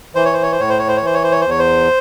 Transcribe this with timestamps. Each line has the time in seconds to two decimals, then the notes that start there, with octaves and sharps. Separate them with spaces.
0.15 E3 C5
0.25 C#5
0.33 C5
0.43 C#5
0.52 C5
0.59 A2 C#5
0.69 C5
0.79 C#5
0.88 C5
0.97 C#5
1.01 E3 C5
1.14 C#5
1.24 C5
1.32 C#5
1.41 C5
1.45 E2
1.50 C#5
1.59 C5